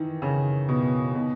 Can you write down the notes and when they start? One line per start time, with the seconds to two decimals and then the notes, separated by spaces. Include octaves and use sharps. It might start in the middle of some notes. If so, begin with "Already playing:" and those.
Already playing: D#3 E3
0.22 C#3
0.69 B2
1.15 B2